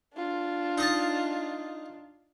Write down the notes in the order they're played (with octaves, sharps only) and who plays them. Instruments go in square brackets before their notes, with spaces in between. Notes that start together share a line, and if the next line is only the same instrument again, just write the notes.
[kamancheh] D4 F4
[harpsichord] D#4 D#5 A5